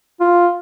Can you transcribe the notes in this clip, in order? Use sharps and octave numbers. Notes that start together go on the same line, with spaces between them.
F4